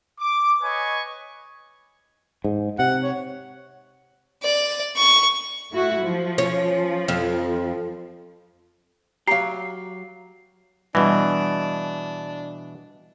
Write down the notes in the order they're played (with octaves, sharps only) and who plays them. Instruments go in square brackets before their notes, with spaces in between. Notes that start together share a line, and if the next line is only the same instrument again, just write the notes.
[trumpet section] D6
B4 C#5 D#5 G#5 C#6
[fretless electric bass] G#2
[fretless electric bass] C3 [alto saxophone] F#5
[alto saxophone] C#5
[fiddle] D5
C#6
[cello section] A3 E4 F#4
F3
[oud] C#4
F2
[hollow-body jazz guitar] F#3 G4 [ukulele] F5 A#5 [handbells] C7
[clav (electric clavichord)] B2 E3 [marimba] G3 [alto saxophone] D4